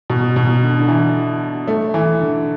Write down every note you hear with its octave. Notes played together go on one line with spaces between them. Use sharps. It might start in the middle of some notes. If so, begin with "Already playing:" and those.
B2
B2
D3
D3
E3
A3
E3
D3